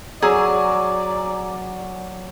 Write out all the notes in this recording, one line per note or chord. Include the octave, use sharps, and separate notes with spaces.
F#3 G#4 D5 G#5 A#5 E6